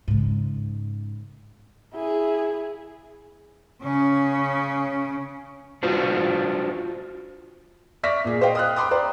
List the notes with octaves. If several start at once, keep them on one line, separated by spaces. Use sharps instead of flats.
G#2 C#3
E4 G#4
C#3 C#4
D4 F4 F#4 C5
D5 E5 C#6 F6 A#6 B6
A#2 G#4
C5 D#5 F5 G5
D#6 F6 F#6
G5 B5 C6 D6 D#6
C5 D5 A#5